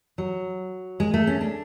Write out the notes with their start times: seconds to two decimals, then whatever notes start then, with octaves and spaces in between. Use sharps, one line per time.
0.18 F#3
1.00 G#3
1.14 A3
1.27 C#4
1.41 D4